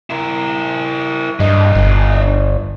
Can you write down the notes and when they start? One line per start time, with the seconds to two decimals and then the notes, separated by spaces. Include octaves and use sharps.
0.10 E4 A#4
1.40 G2 D4 D#5
1.75 G1